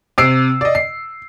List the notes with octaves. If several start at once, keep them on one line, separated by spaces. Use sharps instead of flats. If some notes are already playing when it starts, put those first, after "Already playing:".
C3 E6 C7 D7
D5 D#5
C7